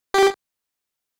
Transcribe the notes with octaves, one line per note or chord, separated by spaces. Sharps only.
G4